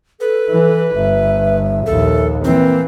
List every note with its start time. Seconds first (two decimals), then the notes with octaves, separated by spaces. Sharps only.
0.20 A4 B4
0.50 E3
0.96 G1 E5
1.86 A#1 D#2 A4
2.44 E3 A#3 C4